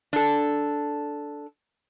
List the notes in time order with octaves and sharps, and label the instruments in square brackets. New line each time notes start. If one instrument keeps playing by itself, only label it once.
[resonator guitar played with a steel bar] D4 A4